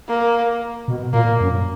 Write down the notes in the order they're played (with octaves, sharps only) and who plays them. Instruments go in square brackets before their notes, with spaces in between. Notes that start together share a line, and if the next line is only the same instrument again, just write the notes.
[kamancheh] A#3
[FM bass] B2
[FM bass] A#2 [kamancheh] A#3
[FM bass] F#2